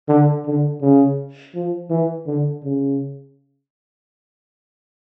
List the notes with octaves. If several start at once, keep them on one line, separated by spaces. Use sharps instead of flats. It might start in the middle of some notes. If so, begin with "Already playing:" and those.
D3
D3
C#3
F3
E3
D3
C#3